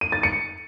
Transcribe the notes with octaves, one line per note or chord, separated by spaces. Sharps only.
D#7
A6
C#7